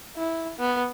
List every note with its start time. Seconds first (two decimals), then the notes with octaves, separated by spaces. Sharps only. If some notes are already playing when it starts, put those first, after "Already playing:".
0.16 E4
0.58 B3